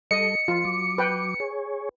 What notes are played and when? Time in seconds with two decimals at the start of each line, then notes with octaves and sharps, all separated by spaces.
0.11 G3 A4 D#5 C#7
0.48 F3 F4
0.65 F#3 D6
0.98 B4 G5
1.40 G#4 C#5